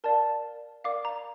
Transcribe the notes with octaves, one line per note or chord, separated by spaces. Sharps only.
A#4 D5 F5 A5
A#4 D5 F5 D6
A#5